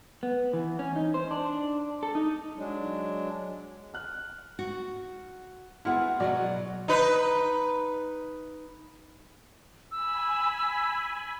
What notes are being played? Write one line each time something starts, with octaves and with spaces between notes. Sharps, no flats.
B3
E3
C#4
D#4
C5
D4
A4
D#4
F#3 G#3 D4
F6 F#6
F#4
B3 E4 F#4 G#4 F#5 C6 F6
B2 F#3 F#4 D5 D#5
D#4 B4
G#5 B5 E6